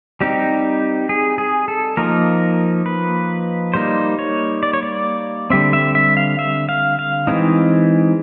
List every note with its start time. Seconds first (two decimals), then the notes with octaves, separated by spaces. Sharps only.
0.21 G3 C4 D#4 G4
1.09 G#4
1.38 G#4
1.68 A4
1.97 F3 A#3 D#4 A#4
2.86 B4
3.74 G3 A#3 D#4 C5
4.19 C#5
4.63 D5
4.73 C#5
4.83 D5
5.50 D3 G3 C4 E5
5.73 E5
5.95 E5
6.17 F5
6.39 E5
6.69 F5
6.99 F5
7.27 E3 G#3 C4 D#4